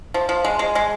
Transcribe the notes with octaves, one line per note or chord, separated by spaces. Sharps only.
F3
F3
G#3
G#3
G#3